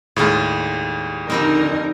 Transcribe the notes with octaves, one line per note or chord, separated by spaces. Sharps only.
D#2 A2 G3 G#3 F4
D3 F3 G3 C4 D#4 A#4